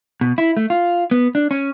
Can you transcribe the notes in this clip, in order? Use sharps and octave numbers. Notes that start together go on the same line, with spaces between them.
B2
E4
A3
F4
B3
D4
C#4